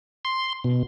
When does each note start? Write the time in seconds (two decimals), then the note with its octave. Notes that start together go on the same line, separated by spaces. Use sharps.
0.25 C6
0.64 B2